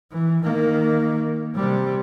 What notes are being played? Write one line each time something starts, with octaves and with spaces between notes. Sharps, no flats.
E3
D#3 A#3
C3 G3